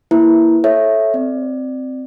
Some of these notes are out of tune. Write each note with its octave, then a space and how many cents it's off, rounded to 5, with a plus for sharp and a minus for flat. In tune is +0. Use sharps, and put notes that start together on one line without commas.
A#3 +0 E4 +0 B4 +0
A4 -10 C#5 -20 E5 +0
C4 -5 D5 +20